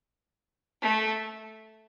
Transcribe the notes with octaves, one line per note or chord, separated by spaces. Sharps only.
A3